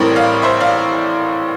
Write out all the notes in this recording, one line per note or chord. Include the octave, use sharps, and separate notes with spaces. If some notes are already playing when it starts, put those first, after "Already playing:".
Already playing: A1 A2 G3 C4 A#4 D5
D5 F5
C5 E5
D5 F5